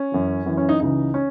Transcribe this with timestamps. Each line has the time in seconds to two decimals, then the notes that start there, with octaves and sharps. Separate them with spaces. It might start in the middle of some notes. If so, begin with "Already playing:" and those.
Already playing: C#4
0.12 F#2 E3
0.46 F#2 E3
0.57 C#4
0.69 D#4
0.80 C#2 C#3 E3 D#4
1.14 C#4